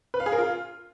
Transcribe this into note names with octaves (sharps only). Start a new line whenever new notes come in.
B4
F5
G#4
A#4
F4